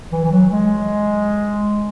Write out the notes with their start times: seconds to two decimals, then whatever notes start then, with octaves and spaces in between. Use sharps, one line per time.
0.12 E3
0.24 E3
0.31 F#3
0.51 G#3